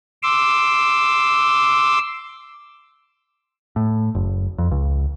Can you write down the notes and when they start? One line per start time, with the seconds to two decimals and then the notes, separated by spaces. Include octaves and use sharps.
0.23 C6 D6 E6
3.76 A2
4.15 F#1
4.58 F2
4.71 C#2